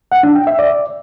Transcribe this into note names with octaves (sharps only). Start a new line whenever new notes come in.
F#5
D4
G5
E5
D5